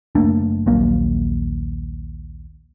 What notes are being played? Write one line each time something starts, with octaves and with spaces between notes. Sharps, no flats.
F#1 A3 A#3 D4
D#1 A#1 F#3 A#3